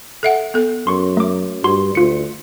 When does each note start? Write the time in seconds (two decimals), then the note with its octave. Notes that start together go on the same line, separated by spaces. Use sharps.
0.23 A4 E5 F#5
0.54 B3 A4
0.87 F#2 C6 C#6
1.17 A3 D6
1.64 G2 F#4 C6
1.95 D2 F4 C#7